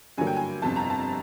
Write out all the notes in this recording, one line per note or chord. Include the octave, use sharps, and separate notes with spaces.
G2 D3 F#3 A#3 G#5
G5
G#5
G1 F2 C3 A5
A#5
A5